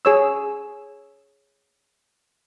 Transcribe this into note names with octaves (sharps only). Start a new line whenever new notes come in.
G#4 C#5 E6